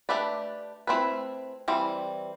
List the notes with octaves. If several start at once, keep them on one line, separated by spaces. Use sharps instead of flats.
A3 D4 G4 B4 D5
A3 C4 E4 B4
E3 G3 C4